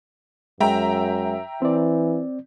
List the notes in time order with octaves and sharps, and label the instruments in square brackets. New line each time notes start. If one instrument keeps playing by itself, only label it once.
[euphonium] F#2 [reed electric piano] G#3 [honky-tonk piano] E5 G5 A#5
[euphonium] E3 [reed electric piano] C4 D5